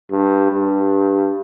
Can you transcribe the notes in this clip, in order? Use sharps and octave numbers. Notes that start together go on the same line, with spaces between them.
G2
G2